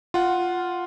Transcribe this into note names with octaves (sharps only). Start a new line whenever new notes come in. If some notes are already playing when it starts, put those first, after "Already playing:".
F4 F#5